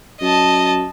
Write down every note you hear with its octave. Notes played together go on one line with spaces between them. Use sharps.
F#2 D#5 A5